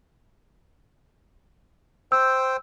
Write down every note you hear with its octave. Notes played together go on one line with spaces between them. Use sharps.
C5 G5 E6 G6